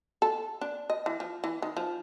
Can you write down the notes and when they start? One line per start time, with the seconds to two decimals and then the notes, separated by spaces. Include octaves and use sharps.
0.22 A4
0.61 D4
0.90 D#5
1.06 E3
1.20 F3
1.44 E3
1.62 D#3
1.77 F3